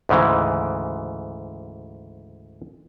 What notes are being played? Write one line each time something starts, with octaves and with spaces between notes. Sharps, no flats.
D2 G#2 C#3 E3